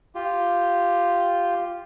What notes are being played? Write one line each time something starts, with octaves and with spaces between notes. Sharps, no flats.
F4 G4